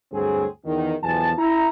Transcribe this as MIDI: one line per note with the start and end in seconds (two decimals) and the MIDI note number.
0.12 0.45 38
0.12 0.45 43
0.12 0.45 54
0.12 0.45 60
0.12 0.45 68
0.65 0.93 40
0.65 0.93 51
1.02 1.32 35
1.02 1.32 40
1.02 1.32 47
1.02 1.32 53
1.02 1.32 80
1.02 1.32 81
1.38 1.67 64
1.38 1.67 82